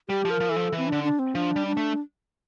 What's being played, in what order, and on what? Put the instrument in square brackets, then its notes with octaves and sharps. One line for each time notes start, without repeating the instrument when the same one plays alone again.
[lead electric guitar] G3 [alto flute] G4
[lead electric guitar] F3
[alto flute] A#4
[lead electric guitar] F3
[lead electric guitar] E3 [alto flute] A4
[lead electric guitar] F3
E3
[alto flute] C4
D4
[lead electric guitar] D3
[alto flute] D4
C4
[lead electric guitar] F3 [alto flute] D4
[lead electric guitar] G3
[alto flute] D4
[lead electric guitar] A3